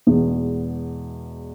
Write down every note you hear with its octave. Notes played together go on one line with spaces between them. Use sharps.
E2 B2 G#3